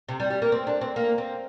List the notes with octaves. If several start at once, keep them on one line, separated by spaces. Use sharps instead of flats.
C3
G3
G3
A#3
C4
D4
C4
A#3
C4